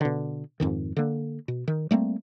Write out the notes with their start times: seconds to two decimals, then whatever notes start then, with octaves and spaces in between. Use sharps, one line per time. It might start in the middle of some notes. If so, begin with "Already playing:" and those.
0.01 B2 D3
0.60 F2 G#2 D#3
0.97 D3 A#3
1.48 B2
1.68 D#3
1.91 G3 A3 A#3 C4